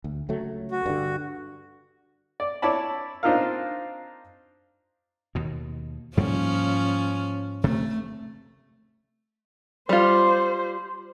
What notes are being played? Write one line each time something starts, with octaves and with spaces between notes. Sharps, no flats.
D2
C#2 F#3 A3
F#4
G2 D3
D5
E4 C#5 D5 A5 B5
C4 D4 D#4 F4 A#4 F5
D#2 B2
G#2 F3 G3 A#3 C#4
C3 A3
G3 F4 C5